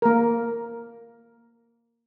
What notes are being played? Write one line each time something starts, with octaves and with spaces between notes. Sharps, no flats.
A#3 A#4